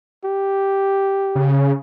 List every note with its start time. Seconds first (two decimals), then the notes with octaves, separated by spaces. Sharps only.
0.24 G4
1.35 C#3